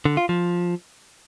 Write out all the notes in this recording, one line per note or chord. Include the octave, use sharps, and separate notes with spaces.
D3
F4
F3